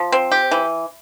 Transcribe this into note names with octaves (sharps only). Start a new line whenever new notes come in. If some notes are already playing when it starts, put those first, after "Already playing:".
Already playing: F3
C4
G4
E3